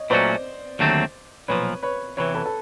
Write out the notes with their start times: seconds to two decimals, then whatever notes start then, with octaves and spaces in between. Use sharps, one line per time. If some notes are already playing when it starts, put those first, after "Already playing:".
Already playing: C#5 D#5
0.10 A#2 F#3 A3 C#4 F#4 C5 D5
0.79 D#2 D3 F#3 A3 C4
1.48 B1 A#2 F3 B4 C#5
1.83 B4 C#5
2.17 E2 C3 E3 B4 C#5
2.35 A4 B4
2.46 A4